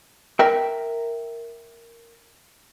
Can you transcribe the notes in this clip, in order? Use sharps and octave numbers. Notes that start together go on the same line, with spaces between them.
A#4 E5 G5